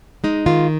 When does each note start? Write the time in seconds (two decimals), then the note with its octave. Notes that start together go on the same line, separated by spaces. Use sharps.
0.24 G#3 D#4
0.46 D#3 F4